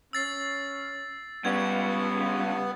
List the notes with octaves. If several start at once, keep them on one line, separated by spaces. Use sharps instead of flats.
C#4 E6 A6 C7
C#2 G3 B3 C#4 G#6